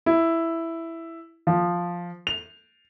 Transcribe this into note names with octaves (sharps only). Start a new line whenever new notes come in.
E4
F3
F7